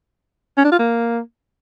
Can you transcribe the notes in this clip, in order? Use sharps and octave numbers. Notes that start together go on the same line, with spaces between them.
C#4
D4
F4
A#3